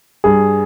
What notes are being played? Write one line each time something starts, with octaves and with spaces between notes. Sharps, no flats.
G2 G#4